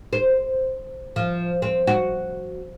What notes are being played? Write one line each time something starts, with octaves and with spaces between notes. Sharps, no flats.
C5
F3
C4
F#4